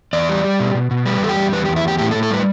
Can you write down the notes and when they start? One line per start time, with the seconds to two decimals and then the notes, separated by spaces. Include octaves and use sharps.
0.13 E2 D5
0.29 G3
0.45 G3
0.60 B2
0.74 B2
0.91 B2
1.05 G3 B4
1.21 E2 A4
1.29 G4
1.36 G3
1.52 E2 B4
1.65 G4
1.68 E2
1.76 E4
1.84 E2 G4
1.98 A2 G4
2.11 A4
2.15 A2
2.23 A4
2.31 G3 B4